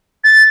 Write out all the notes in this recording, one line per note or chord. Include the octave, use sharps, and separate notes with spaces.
A6